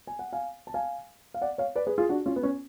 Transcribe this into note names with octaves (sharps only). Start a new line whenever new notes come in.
G#5
F#5
F5 G#5
A5
F5 G#5
F5
D5 F#5
C#5 F5
B4 D5
G#4 B4
F4 G#4
D4 F#4
C#4 F4
B3
C#4